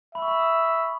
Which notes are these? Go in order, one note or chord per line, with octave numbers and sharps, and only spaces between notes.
E5 B5
C#6
B5
D#6